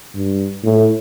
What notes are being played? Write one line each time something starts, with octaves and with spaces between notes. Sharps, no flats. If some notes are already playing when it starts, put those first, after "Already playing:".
G2
A2